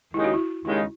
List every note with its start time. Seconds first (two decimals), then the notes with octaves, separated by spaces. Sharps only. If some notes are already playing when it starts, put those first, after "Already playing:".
0.14 D#2 C#3 G#3 D#4 E4
0.24 F#4
0.34 E4
0.65 D#2 C#3 G#3 D#4 E4